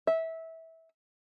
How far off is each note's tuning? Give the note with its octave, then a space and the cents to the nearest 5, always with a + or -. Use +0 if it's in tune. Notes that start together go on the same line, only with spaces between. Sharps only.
E5 -20